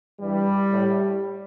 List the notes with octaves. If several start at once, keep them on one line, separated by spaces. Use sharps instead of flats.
G2 E3 G3
A2